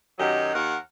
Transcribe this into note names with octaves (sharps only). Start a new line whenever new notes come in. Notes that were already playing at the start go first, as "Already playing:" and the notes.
F#2 D#3 F#3 G4 D#5
D#2 A#4 F#5